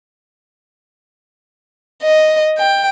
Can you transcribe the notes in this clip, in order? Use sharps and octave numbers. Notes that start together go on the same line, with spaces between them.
D#5
G5